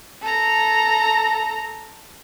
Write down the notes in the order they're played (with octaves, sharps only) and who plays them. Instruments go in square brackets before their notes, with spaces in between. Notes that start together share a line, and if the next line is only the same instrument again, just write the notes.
[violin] A4 A#5